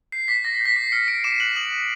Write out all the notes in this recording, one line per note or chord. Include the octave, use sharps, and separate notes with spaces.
G6 C7
D6 B6
D6 A#6
A#6
G6
B6
D6 C7
F6 C#7
F6 D7
D6 E7
F#6 F#7
D#6 F#7
D#6